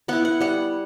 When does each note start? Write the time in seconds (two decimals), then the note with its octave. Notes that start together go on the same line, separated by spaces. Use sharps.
0.08 B3 E4 F#5
0.25 F#5
0.40 G3 F#5